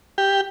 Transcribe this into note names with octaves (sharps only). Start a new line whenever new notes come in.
G4